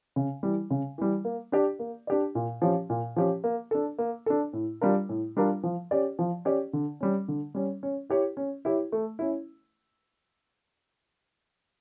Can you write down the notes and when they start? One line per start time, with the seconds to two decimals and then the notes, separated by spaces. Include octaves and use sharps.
0.16 C#3
0.43 E3 G3
0.70 C#3
0.98 E3 G3
1.25 A#3
1.52 D4 G4 D5
1.79 A#3
2.07 D4 G4 D5
2.35 A#2
2.62 F3 C#4 G4
2.90 A#2
3.16 F3 C#4 G4
3.44 A#3
3.71 D4 A4
3.98 A#3
4.26 D4 A4
4.53 A2
4.81 G3 D4 F4 A#4
5.09 A2
5.37 G3 D4 F4 A#4
5.63 F3
5.91 C#4 G4 D5
6.19 F3
6.45 C#4 G4 D5
6.73 D3
7.00 G3 C#4
7.28 D3
7.55 G3 C#4
7.83 C#4
8.10 E4 G4 C#5
8.37 C#4
8.65 E4 G4 C#5
8.92 A3
9.19 C#4 E4